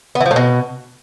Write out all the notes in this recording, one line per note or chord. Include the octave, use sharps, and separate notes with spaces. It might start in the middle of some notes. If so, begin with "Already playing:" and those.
B3
E3
F3
A2
B2